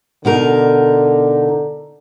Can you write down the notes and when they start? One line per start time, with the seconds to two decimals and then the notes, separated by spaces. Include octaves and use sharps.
0.25 B2 D3 D#4 A#4